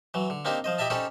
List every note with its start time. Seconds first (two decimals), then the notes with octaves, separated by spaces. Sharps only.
0.14 E3 F#3
0.30 D3
0.45 A#3 C4 D4 D#4 G4 C5
0.64 F3 C5 D#5
0.78 E4 G4 D#5 E5 A5
0.90 C#4 D#4 G4 A4 C5 D5